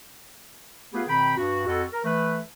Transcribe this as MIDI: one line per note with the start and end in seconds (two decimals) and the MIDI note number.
0.94 1.02 57
0.94 1.02 59
0.94 1.02 65
0.94 1.02 67
0.94 1.02 68
0.94 1.02 71
1.08 1.36 47
1.08 1.36 51
1.08 1.36 60
1.08 1.36 79
1.08 1.36 83
1.37 1.65 43
1.37 1.65 66
1.66 1.84 41
1.66 1.84 66
1.66 1.84 69
1.93 2.02 70
2.04 2.39 52
2.04 2.39 57
2.04 2.39 71